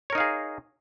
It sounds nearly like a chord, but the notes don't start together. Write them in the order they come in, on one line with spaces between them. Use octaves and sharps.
C#5 A#4 D#4 F5 G#4